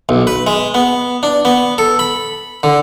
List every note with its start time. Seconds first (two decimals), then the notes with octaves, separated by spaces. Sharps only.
0.09 B1
0.27 B4
0.47 G#3
0.74 B3
1.23 D4
1.45 B3
1.78 A4
1.99 B5
2.63 D3